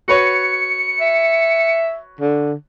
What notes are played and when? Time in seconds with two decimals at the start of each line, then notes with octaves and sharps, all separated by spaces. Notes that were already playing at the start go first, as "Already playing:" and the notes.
0.08 F#4 B4 C#5 C#7
1.01 E5
2.21 D3